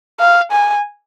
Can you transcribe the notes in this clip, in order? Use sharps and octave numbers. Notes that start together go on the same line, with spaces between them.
F5
G#5